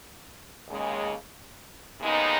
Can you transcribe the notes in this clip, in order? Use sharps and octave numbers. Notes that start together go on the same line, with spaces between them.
D#2 C#3 G#3
D#2 C#3 G#3 B3 D#4